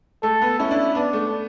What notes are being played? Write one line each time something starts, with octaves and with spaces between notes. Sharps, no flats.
A3 A4
B3
C#4 E4
D4
B3 D4
A3